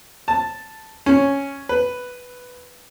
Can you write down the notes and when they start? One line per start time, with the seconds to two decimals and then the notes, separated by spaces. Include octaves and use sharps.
0.28 A5
1.06 C#4
1.69 B4